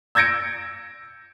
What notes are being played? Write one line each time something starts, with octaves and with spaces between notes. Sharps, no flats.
E6 G6 G#6 A#6 C#7 D7